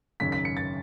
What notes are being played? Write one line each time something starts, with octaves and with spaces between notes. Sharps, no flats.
G#1 F#2 C#3 B6
B6
C#7
A6